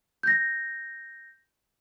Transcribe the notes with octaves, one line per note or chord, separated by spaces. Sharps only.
G6 A#6